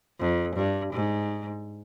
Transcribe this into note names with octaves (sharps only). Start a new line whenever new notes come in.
F2
G2
G#2